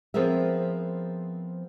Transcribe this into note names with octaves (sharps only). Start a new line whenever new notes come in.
F3 B3 C4 G#4 A#4 E5